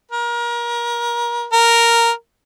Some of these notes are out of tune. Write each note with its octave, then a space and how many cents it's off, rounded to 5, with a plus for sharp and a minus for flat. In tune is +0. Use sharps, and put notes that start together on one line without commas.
A#4 +30
A#4 -5